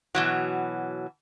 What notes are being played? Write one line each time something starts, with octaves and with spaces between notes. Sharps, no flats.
B2 E3 F#3